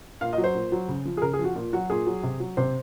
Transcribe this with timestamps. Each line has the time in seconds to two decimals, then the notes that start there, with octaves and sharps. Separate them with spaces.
0.21 A#2 F5
0.33 D#5
0.38 F#3
0.44 C5
0.55 A#2
0.72 F#3
0.88 C#3
1.05 F3
1.17 G#4
1.22 C#3 A#4
1.33 G#4
1.39 F3
1.44 F#4
1.56 A#2
1.73 F#3 F#4
1.89 A#2 G#4
2.07 F#3
2.23 C3
2.40 F#3
2.57 C3 C5